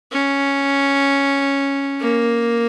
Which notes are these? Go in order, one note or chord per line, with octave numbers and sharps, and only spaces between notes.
C#4
A#3